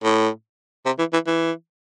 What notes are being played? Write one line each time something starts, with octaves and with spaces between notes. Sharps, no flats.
A2
C3
E3
E3
E3